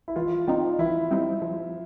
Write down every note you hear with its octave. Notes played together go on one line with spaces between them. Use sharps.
E4
E3 F4
G3 C4 D#4 F4
E3 E4
G3 C4 D#4
F3